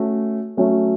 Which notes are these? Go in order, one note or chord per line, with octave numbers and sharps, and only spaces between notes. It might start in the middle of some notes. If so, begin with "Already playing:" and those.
Already playing: A3 C#4 F#4
F#3 A3 C#4